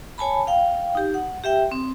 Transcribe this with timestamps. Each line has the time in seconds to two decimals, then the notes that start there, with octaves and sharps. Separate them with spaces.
0.18 C#5 G#5 A5 B5
0.47 F5 G5
0.95 D#4 G4
1.14 F#5
1.44 G4 E5 G5
1.72 C4